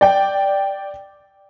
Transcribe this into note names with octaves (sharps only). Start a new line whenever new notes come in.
D5 G5